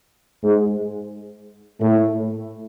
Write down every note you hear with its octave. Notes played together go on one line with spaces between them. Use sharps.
G#2 G#3
A2 A3